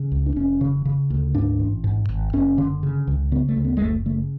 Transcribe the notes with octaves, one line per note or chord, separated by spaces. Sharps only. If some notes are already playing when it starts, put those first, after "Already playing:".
Already playing: C#3
C#2
D4
F1 C#4
C#3
C#3
D2
G#2 D4
A1
G#2
G#1
F#1 C#4
D3
C#3
C#2
C#3 B3
A3
D2
B3
G#3
F#1 A3
C#3 A3